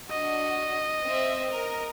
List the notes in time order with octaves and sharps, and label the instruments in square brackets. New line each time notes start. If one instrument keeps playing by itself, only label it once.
[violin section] D4 F#4 [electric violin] D#5
[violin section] C4 E5
A#4